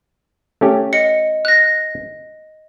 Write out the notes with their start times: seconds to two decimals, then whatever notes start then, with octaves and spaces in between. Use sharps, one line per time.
0.61 A3 C#4 G4
0.93 D#5 C#7
1.45 F#6 A#6